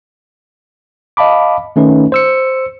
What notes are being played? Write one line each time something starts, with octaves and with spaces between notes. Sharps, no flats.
D#5 F5 A5 B5 D6
D#3 A3 C#4 D#4 B4
C5 E6 C#7